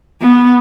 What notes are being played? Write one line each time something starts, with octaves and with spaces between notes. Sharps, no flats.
B3